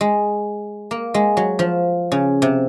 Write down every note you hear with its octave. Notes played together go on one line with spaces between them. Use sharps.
G#3
A#3
G#3
F#3
F3
C#3
C3